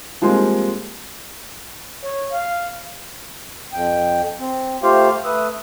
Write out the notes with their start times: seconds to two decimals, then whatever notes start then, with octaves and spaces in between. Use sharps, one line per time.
0.22 F3 G3 G#3 A#3 C4
2.03 C#5
2.32 F5
3.73 F2 G5
4.39 C4
4.83 A3 F4 G4 C5 F5
5.25 A3 B4 D#6 E6